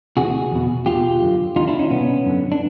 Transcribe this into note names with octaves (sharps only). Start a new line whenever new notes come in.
D2 C3 E3 F#4 G#4
E2 B2
E2 B2 F4 G4
F#2 D3
D#2 D3 D#4 F4
D4 E4
C#4 D#4
C2 B2 B3 C#4
F#2 D3
D4